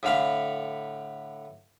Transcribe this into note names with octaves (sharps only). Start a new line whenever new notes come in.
A2 D3 F5 B5